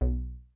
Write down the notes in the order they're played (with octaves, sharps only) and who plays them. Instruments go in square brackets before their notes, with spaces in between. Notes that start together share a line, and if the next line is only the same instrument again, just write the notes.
[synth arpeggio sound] B1